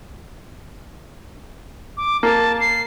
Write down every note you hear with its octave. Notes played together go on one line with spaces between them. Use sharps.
D6
A#3 A5
C7